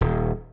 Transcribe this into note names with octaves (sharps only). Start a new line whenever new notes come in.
D#1